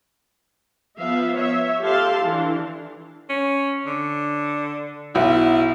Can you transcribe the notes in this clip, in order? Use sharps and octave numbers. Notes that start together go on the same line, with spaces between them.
F3 B3 E5 F5
C#5 E5
G4 A4 F5 A5 C6
E3 D4
C#4
D3
B1 E4